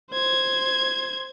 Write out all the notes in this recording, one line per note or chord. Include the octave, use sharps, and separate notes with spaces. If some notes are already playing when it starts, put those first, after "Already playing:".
C5 G#6